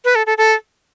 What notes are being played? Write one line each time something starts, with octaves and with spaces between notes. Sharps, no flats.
B4
A4
A4
A4